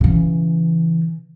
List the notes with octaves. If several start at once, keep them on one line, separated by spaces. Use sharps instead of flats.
C#3 E3